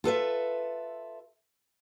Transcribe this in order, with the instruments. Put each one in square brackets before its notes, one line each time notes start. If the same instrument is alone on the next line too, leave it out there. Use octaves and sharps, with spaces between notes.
[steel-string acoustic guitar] F4 A4 B4 E5